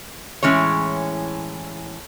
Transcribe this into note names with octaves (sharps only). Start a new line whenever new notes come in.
A2 E3 G#3 C#4 C#5